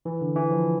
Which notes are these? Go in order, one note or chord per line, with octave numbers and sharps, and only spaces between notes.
E3
D3
E3
F3